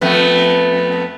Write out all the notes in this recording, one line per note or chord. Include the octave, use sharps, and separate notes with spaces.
F2 A3 B3